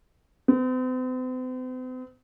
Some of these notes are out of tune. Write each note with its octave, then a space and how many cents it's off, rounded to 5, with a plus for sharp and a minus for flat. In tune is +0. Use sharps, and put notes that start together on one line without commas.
C4 -45